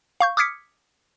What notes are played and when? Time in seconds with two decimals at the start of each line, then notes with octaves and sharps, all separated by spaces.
0.20 F5 C#6 G6
0.37 D6 D#6 F6 G#6 B6 C#7